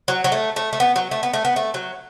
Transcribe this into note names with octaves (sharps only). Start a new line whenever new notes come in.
F#3
F#3
A3
A3
A3
B3
F#3
A3
B3
A3
B3
A3
F#3